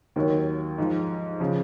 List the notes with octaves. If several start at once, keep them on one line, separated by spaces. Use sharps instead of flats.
D#2 D#3 F#3
G#2 F3
C#3 F3